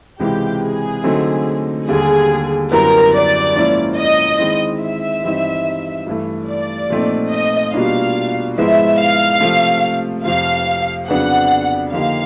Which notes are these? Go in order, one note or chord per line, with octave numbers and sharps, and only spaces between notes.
C#2 C3 E3 G#3 G4
G#4
D3 F#3 A3 C4 D#4
D#2 D3 G3 G#4
F#2 D3 G3 B3 E4 A#4
D5
G#2 F3 A#3 C#4 E4
D#5
D#3 G#3 C4 E4
E5
G2 E3 G3 C4 D#4
G2 E3 A3
D5
A#2 F3 A3 C4 D#4
D#5
B2 G3 A#3 D4 F4 F5
G#2 F3 G#3 B3 E4 E5
F5
C3 F3 A3
F2 C3 F3 F5
F2 C#3 F#3 B3 D4 F#5
D3 F3 A#3 D#4 G4 F5